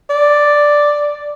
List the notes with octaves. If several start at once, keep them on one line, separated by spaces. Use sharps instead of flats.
D5